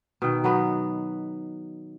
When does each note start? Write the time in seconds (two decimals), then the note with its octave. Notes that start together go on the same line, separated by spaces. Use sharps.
0.22 B2 D#3 G5
0.44 F#3 B3 F#4 B4